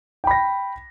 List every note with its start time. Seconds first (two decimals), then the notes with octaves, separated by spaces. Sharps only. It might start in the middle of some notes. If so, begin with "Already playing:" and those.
0.24 G5
0.27 B5
0.31 A#6